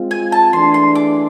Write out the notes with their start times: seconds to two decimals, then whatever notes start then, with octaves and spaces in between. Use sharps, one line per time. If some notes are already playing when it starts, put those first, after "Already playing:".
Already playing: G#3 C4 F4
0.11 G#5
0.32 A5
0.53 E3 A3 D4 G#4 C6
0.74 C6
0.95 D6